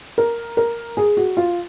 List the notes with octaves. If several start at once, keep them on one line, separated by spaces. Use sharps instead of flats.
A#4
A#4
G#4
F#4
F4